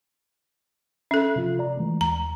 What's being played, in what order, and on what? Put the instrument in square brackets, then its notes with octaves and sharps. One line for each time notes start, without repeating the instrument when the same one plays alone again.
[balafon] C#4 A4 [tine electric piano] E5
[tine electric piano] C3 F3 F4
D5 A#5
E3 G#3 A3
[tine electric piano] D#2 [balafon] A#5